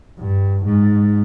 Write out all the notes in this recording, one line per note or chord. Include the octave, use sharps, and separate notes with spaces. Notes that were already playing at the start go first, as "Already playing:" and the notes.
G2
G#2